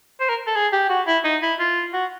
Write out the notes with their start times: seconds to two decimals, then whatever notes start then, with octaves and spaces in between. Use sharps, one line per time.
0.20 C5
0.29 A#4
0.47 A4
0.56 G#4
0.72 G4
0.89 F#4
1.07 E4
1.24 D#4
1.42 E4
1.59 F4
1.93 F#4